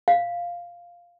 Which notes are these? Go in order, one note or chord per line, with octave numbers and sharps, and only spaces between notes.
F5